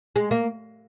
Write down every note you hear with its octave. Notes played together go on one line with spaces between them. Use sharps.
G#3
A#3